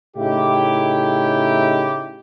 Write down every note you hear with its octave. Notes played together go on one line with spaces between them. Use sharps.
A2 C#3 D#4 E4 G4